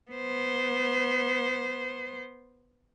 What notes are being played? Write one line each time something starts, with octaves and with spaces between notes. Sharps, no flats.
B3 C5